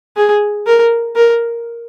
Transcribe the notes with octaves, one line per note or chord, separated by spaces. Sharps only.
G#4
A#4
A#4